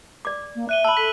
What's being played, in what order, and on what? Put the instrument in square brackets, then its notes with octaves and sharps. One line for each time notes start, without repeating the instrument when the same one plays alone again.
[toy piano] D5 D6
[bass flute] A#3
[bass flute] E5 [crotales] F#6 D#7 G7
[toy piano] A5 B5 [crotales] E6 F#7
[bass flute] A4 [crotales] B6